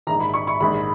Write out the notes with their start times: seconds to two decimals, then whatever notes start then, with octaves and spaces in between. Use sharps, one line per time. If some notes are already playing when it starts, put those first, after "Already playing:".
0.07 A#1 G#2 D#3 A#5
0.20 B5
0.34 C#6
0.47 C#6
0.61 A#1 G#2 D#3 B5